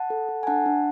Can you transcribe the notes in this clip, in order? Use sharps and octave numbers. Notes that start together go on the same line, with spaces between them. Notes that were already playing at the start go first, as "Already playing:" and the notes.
Already playing: F#5 A5
A4
A4
G#5
D4 F#5 A5
D4